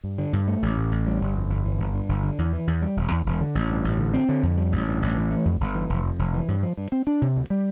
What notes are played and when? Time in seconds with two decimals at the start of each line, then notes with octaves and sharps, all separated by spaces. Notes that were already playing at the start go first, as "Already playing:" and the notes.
0.04 G2
0.18 D3
0.33 G2
0.48 A3
0.62 A1
0.77 A2
0.92 A1
1.07 G3
1.21 G1
1.35 F2
1.50 G1
1.65 E3
1.79 G1
1.94 G2
2.09 G1
2.23 D3
2.38 E2
2.53 E3
2.67 E2
2.82 G3
2.97 E1
3.11 E2
3.26 E1
3.41 D3
3.55 A1
3.69 G2
3.84 A1
3.99 D3
4.14 C4
4.29 D3
4.43 F2
4.58 G3
4.72 A1
4.87 G2
5.02 A1
5.16 E3
5.31 A3
5.45 F2
5.60 G1
5.75 E3
5.89 F1
6.04 F2
6.19 F1
6.34 E3
6.48 G2
6.63 F3
6.77 G2
6.92 C4
7.07 D4
7.22 C3
7.36 D2
7.50 G3